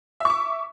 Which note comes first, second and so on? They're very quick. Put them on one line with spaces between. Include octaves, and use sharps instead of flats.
E5 C#6 D6